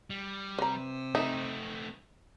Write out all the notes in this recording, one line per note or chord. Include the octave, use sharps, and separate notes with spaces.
G3
C3 B4 A#5
A3 C4 D#4 E5